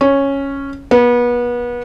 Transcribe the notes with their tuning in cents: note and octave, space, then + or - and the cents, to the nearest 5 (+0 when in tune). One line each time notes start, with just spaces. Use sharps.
C#4 -5
B3 -30